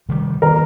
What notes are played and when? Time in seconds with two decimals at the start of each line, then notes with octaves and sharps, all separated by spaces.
0.09 C3 D#3 G3
0.42 D#3 A#3 A#4